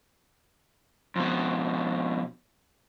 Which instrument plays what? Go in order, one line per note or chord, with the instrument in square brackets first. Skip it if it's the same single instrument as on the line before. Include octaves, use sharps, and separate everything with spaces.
[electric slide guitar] F2 B2